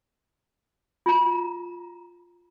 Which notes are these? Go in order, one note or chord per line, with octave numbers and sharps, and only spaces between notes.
F4 A#5